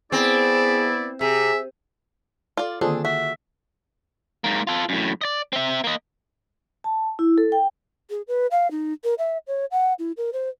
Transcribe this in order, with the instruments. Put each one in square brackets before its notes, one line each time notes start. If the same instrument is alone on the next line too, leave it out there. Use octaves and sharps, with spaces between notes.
[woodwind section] B3 E4 [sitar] C4 [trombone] G#4 [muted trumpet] D5
[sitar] C3 [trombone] G#4 [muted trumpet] E5
[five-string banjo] F4 D5 [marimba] A4 F5
[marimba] D3 D#3 A#3 [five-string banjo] C4 D4 [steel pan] F4 G#4 A4
[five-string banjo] F#4 [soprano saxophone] E5
[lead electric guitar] G#2 A#3
F4 A4
F#2 A2
D5 D#5
C4 E5
A#3 D#5
[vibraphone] A5
E4
A4
G5
[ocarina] G#4
B4
F5
D#4
A#4
E5
C#5
F#5
E4
A#4
C5